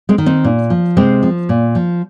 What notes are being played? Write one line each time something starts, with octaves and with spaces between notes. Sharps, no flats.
G#3 C4
D#3
C4 D#4
A#2
F3
C3 G#3 C4
F3
A#2
F3